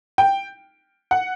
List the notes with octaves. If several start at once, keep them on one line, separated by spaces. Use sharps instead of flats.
G5
F#5